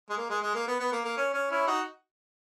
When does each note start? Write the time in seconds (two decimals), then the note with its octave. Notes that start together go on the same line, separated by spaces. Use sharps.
0.10 G#3
0.17 A#3
0.30 G#3
0.42 G#3
0.55 A#3
0.68 B3
0.80 B3
0.92 A#3
1.05 A#3
1.17 C#4
1.34 C#4
1.51 C#4 E4
1.67 D#4 F#4